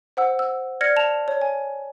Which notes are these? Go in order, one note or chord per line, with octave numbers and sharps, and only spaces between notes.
C5 F#5 E6
E6
D5 F6 G#6 A#6 C#7
A5 E7 F7
C#5
G#5